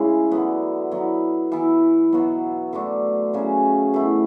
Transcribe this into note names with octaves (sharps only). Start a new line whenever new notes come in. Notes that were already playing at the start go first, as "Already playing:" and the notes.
Already playing: C#3 G#3 C#4 E4
D3 F#3 B3
F#3 B3 E4
E3 B3 E4
B2 F#3 B3 F#4
D3 A3 D4 F#4
C#3 F#3 C#4 F#4
B2 A3 E4